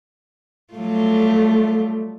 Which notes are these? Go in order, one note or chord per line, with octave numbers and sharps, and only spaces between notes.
F#3 G3 A3 F4